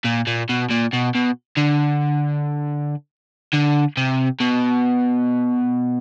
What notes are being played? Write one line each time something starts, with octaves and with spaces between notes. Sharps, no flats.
A#2
A#2
B2
A#2
B2
B2
D3
D3
C3
B2